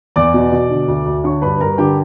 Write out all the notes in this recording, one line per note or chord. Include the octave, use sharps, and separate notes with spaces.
E2 D5 D6
B2
B2
D3
D2
D2
D3 C#5 C#6
G2 B4 B5
G2 A#4 A#5
D3 G4 G5